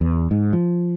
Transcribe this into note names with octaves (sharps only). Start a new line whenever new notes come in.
E2
G#2
F3